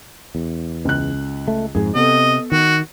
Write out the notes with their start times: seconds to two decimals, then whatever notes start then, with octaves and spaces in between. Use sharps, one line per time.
0.35 E2
0.85 C#2 F#6
1.48 A3
1.75 F2 G#2 G#4
1.95 C3 B3 A4 D#5
2.52 D#3 F#4